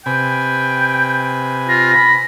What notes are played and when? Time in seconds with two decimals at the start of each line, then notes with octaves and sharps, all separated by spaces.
0.06 C3 B4 G5 G#5
1.68 F4 A#6
1.94 B5